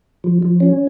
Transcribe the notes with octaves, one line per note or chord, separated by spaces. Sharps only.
F3
F3
C#4